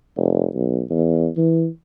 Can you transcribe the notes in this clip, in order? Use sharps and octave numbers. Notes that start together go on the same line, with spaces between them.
F1
B1
E2
E3